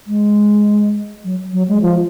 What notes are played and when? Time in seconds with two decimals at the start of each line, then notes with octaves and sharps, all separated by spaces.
0.07 G#3
1.24 F#3
1.53 F#3
1.68 G#3
1.82 F3